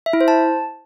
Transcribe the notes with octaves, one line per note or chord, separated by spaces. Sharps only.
E5
E4
C5
A5